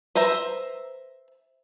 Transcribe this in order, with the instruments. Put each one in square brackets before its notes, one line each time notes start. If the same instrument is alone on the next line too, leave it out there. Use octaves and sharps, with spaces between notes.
[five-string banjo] B4 C5 E5 A#5